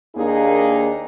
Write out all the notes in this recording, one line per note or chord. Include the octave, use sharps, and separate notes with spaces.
D#2 A#3 D4 D#4 G#4